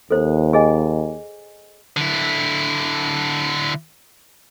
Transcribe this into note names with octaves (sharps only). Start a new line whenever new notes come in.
D#2 A4 C5
G#4 D#5 G#5
D3 E4